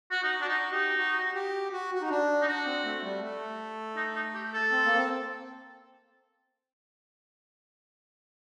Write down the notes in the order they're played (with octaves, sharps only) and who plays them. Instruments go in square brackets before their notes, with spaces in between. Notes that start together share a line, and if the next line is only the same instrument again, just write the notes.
[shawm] F#4
[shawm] D#4 [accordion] F#4
[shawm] D4
[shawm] D#4 [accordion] F#4
[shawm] D#4 [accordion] G4
[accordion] F#4
G4
F#4
F#4
D#4
D4
[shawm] D#4
[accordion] D4 [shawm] F#4
[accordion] C4
A3
G3
A3
[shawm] D#4
D#4
G4
A4
[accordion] C4
A#3
C4